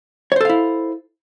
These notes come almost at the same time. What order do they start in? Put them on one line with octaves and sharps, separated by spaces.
C#5 C5 A4 F5 E4